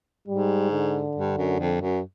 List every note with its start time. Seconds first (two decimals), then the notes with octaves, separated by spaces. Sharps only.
0.28 G#2 G3
0.72 D3
1.16 G2
1.37 F#2
1.59 F2
1.81 F#2